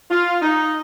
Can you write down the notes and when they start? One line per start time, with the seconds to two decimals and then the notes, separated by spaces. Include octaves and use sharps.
0.10 F4
0.42 D#4